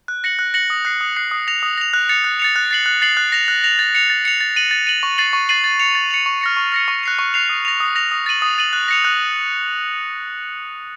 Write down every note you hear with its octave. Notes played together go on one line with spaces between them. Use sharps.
F#6
A#6 C#7 F#7
F#6
A#6 C#7 F#7
D#6
F#6 C7
D#6
F#6 C7
D#6
A#6 F7
D#6
A#6 F7
F#6
A6 C#7 F7
F#6
A6 C#7 F7
F#6
A6 C7 F#7
F#6
A6 C7 F#7
F#6
A#6 F7
F#6
A#6 F7
A6
C#7 F7
A6
C#7 F7
A6
D#7 F#7
A6
D#7 F#7
C#6
A6 C7 D#7 F#7
C#6
A6 C7 D#7 F#7
A6
C#7 F7
A6
C#7 F7
C#6
F6 A#6 C#7
C#6
F6 A#6 C#7
C#6
F#6 C7 F7
C#6
F#6 C7 F7
D#6
A#6 F7
D#6
A#6 F7
D#6
A6 D#7 F#7
D#6
A6 D#7 F#7
F#6
A#6 C#7 F7
F#6